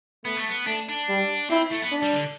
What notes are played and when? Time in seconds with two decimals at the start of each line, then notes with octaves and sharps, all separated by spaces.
0.24 A3 B3
0.37 A3
0.48 B3
0.66 A3 D4
0.89 D4
1.09 G3
1.50 C4 E4
1.71 A3
1.82 B3
1.92 D4
2.02 G3
2.13 D3